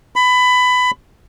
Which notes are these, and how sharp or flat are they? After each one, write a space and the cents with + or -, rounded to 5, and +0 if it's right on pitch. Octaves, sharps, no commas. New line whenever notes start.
B5 +20